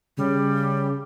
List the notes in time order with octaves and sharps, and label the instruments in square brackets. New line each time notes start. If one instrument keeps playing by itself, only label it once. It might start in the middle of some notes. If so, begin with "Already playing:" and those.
[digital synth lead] C#3 [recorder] G3